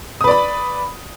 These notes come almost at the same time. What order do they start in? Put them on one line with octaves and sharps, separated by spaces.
D#6 B4 D5 B5